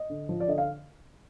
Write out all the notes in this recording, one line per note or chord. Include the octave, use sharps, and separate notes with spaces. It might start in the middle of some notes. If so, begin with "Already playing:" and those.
Already playing: D#5
D3
F3
D5
D3 D#5
F5